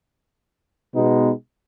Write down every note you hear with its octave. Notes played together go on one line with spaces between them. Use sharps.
B2 G#3 B3 D#4